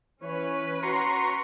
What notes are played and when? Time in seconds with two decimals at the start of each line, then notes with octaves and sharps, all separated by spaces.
0.21 E3 C#4 B4 C#5
0.83 F#4 A#5 C6 C#6